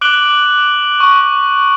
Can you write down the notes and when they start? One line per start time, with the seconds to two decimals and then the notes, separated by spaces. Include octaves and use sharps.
0.01 D6 F#6 D7 F#7 G7
1.00 C#6